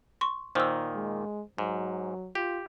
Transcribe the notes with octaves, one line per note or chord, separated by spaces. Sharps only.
C6 C#6
A#2 D#3 C5 E6
G#3
G#2 F#3
F4 G4